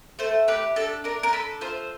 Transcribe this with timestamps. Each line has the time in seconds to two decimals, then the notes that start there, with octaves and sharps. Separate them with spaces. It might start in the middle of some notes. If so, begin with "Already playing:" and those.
0.19 A3 C5
0.48 G4 B4
0.76 D4 A4
1.04 D4 A#4
1.23 A#4
1.33 A4 B4
1.61 F4 C5